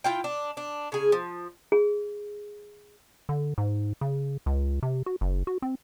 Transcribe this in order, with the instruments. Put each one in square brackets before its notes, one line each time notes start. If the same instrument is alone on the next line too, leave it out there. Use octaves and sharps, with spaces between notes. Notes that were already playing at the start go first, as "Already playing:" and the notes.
[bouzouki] E4 F4 G5
D4
D4
C#3 G#4
F3
[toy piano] G#4
[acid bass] D3
G#2
C#3
C#2
C3
F#4
F#1
F#4
C4